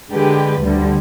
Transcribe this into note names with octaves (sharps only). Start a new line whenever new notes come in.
D3 G#3 G4 B4
D2 D3 G3